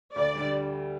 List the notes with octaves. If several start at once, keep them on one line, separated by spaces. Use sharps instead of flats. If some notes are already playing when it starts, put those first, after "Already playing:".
D2 D5
D3 G3